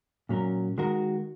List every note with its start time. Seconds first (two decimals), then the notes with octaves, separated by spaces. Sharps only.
0.29 A#2 F#3 C#4 A#4
0.78 D#3 G#3 F#4 A#4